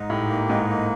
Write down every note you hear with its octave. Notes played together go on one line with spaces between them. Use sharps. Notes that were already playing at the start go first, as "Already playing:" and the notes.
Already playing: G#2 D#4
A2 G4
A#3
G#2 D#4
A#3